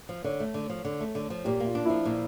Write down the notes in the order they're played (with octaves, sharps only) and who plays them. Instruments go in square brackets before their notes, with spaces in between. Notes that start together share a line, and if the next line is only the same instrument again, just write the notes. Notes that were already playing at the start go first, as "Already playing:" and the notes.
[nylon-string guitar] F3
[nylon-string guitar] D3 [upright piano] C#5
[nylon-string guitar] A3
D3
F3
D3
A3
D3
F3
[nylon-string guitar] A#2 [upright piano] G4
[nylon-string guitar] A#3
[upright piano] F4
[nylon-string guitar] D4
[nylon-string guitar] F3 [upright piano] E4
[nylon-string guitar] A#2